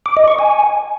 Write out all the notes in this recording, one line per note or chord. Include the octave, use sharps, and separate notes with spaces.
D6
D#5
C#6
G#5